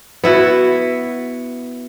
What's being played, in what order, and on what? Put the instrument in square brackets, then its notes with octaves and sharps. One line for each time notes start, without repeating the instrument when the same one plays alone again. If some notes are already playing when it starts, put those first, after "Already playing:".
[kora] B3 E4 F#4